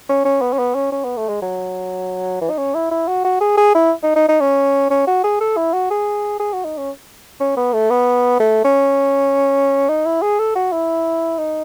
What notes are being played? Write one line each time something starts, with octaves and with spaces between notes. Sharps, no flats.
C#4
C#4
B3
C#4
B3
C#4
C#4
B3
A3
G#3
F#3
E3
D#4
C#4
E4
E4
F#4
F#4
G#4
G#4
E4
D#4
D#4
D#4
C#4
C#4
F#4
G#4
A4
E4
F#4
G#4
G#4
F#4
D#4
C#4
C#4
B3
A3
B3
A3
C#4
D#4
E4
G#4
A4
F#4
E4
D#4